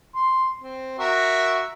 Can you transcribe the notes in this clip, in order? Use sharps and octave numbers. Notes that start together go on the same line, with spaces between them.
C6
C4
F#4 A#4 E5